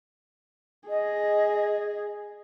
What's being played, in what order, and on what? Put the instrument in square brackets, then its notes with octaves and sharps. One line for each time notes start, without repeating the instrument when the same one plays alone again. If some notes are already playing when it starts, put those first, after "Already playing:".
[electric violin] G#4 [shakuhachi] D#5